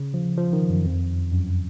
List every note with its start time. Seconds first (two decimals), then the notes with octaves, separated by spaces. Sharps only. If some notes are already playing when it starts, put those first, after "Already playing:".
Already playing: C#3
0.14 F3
0.37 F3
0.53 D#3
0.69 F#2
0.85 F2
1.32 F#2